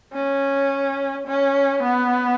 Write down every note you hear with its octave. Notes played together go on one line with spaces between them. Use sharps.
C#4
C#4
B3